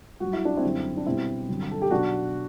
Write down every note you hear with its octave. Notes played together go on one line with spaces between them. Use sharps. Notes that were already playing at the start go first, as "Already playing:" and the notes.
G2 F#3 F#4
E4
D4
C4 E4
F#2 D3 G3
D4
B2 G3 C4 E4
G2 D3 F#3
A4
G4
B2 F#3 D4 F#4